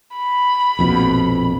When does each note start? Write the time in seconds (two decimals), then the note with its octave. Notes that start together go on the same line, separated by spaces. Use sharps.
0.17 B5
0.79 A#1 F2 B2